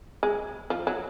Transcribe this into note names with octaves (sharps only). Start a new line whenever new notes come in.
G#3
F3
F#3